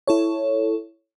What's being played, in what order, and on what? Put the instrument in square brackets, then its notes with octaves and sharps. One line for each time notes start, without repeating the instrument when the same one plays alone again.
[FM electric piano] E4 A4 C#5